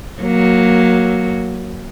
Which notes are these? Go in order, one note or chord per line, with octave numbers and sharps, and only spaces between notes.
F#3 A#3